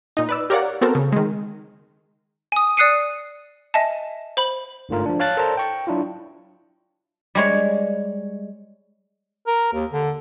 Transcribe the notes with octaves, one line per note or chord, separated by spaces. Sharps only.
A#2 D#4
B4 D5 E6
G4 A#4 C#5 D5 F5 F#5
B3 C4 F#4 A4 A#4 A5
C#3
D#3 G#3
G#5 D#6
D5 D#6 F#6 C7 C#7 D#7
D#5 E5 G#5 A5
C5 B5 F#7
G1 G#2 D3 A3 F4 A#4
F3 D4
C#5 F5 A5 F#6 A6
A4 A#4 C5 D5 A5 A#5
G5 C#6
F#3 D4 E4 F4
G3 G#3 C#5
A#4
D#2
D3